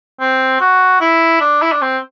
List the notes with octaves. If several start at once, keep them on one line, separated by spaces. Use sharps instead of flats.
C4
F#4
E4
D4
E4
D4
C4